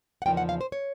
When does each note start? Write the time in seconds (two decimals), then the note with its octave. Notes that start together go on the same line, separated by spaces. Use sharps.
0.22 F#5
0.26 E2 C#3 F3 A#3 D#4 G5
0.37 F#5
0.49 F5
0.61 C5
0.72 C#5